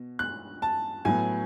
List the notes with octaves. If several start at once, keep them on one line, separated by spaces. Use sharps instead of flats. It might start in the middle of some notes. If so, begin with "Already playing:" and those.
Already playing: B2
F#6
A5
A2 F#3 B3 G#5